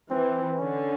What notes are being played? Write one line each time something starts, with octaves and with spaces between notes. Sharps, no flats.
E3 C4
D3 C#4